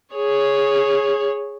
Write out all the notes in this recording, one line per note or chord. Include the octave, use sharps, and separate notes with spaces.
G#4 C#5